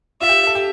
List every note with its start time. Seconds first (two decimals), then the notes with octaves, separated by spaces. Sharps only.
0.21 F4 E5
0.29 G4
0.47 A4
0.55 G4